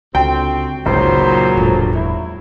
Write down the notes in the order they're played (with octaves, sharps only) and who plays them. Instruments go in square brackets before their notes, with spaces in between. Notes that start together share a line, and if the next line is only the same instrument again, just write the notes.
[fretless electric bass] C#2 [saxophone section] D3 C4 F#4 [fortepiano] G5
[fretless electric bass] G1 [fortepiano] C#2 [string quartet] A#2 F#3 [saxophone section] D#4 C5
[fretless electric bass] E1 A2 G#3 [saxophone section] D3 F3
[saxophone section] E4